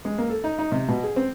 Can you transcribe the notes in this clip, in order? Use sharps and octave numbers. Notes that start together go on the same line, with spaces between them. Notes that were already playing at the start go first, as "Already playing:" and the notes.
G#3
A#3
A4
D#4
D#4
C3
B2
G#4
C4